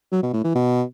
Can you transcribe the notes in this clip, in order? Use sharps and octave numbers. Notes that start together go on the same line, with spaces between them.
F#3
B2
A2
E3
B2